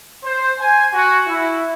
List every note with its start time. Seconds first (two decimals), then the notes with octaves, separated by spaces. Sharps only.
0.24 C5
0.60 G#5
0.93 F#4
1.27 E4